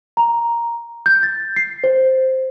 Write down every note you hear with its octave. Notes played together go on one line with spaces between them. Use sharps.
A#5
G6
A6
C7
C5